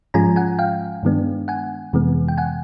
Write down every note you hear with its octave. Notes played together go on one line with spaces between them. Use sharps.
G#2 F3 G#3 C#4 F4 G#5 A#5
F#5 G#5
F5 G5
G2 D#3 G#3 B3 D4
F#5 G#5
F2 C3 E3 G#3 B3
G5
F#5 G#5